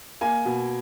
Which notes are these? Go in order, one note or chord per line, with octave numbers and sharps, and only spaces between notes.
A#3 G#5
B2